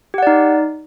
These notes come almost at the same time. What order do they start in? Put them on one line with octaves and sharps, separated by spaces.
G4 F#5 D5 D#4